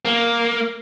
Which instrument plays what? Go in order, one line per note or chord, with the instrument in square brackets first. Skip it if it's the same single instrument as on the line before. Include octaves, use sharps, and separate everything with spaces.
[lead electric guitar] A#3